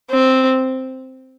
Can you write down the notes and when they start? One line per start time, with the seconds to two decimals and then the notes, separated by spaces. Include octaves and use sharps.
0.11 C4